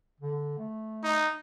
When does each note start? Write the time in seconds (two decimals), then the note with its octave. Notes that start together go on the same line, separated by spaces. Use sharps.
0.20 D3
0.58 A3
1.03 D#4